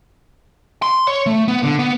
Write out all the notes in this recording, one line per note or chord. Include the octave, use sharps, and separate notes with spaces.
C6
C#5
A3
B3
D3
B3